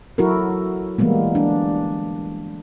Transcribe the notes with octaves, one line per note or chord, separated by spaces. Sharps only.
F#3 E4 F#4 A4 A#4
E3 G3 G#3 A#3 B3
D4